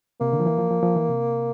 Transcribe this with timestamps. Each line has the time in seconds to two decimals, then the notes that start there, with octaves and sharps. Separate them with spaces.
0.20 C3 A#3
0.33 D3
0.40 F3
0.46 E3
0.58 F3
0.71 F3
0.83 F3
0.96 E3
1.09 C3